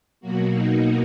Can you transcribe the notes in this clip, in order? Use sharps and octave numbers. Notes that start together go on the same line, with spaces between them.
B2 F#3 A#3 F#4
D#4